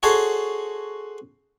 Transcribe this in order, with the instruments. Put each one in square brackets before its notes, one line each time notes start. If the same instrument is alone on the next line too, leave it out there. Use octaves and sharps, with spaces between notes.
[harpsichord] F#4 G#4 A4 C5 C#5